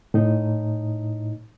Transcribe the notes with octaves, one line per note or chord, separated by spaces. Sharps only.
A2 D#4